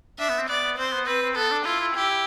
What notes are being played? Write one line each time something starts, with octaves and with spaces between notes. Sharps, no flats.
D4 E5
B3
C4
B3 D5
B3
C4 C5
B3
C4 B4
C4
B3 A4
D4
E4 F4
E4
E4 G4
E4